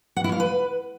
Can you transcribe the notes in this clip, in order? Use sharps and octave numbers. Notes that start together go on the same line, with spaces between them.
F#5
E4
F5
B4